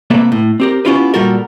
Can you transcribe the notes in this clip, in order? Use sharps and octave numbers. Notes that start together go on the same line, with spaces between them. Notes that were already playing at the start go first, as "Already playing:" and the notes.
C3 A#3 B3 A4 E5
A2
C4 G4 A#4
B3 C#4 E4 F4 G4 B4
A#2 G3 F4 F#4 A4 A#4